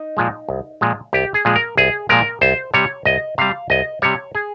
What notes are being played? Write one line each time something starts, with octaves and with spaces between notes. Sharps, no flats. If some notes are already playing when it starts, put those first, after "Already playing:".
Already playing: D#4
A#2 F3 G#3
C2
A#2 F3 G#3
C2 G4
G#4
A#2 F3 G#3
A#4
C2 G#4
A#2 F3 G#3 A#4
C2 C5
C3 G3 C#5
C2 D#5
C3 G3 F5
C2 D#5
C3 G3 C#5
G#4